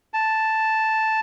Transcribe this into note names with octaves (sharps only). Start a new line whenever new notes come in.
A5